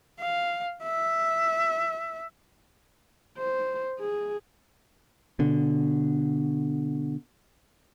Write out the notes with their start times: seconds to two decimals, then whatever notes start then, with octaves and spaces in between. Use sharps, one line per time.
0.20 F5
0.84 E5
3.38 C5
4.00 G#4
5.39 B2 D3